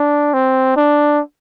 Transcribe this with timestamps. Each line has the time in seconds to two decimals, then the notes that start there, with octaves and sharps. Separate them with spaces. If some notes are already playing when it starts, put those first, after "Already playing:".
Already playing: D4
0.34 C4
0.77 D4